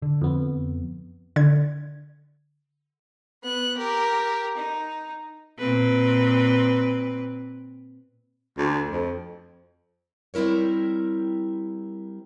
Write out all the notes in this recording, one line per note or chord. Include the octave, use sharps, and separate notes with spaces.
D3
F2 B3
D3 G#6
B3 F#6
G4 A#4
D#4
A#2 C4 B4
D2
F2
G3 C4 E4 A#4 C#5